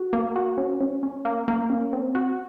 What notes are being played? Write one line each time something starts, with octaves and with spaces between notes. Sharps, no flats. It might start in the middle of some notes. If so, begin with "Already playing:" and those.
Already playing: F#4
A#3
F#4
C#4
C#4
C#4
A#3
A#3
C#4
C4
F#4